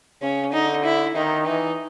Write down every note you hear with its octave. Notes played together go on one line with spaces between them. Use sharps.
C#3 C#4
D3 D#4
E4
D#3 D#4
E3 D#4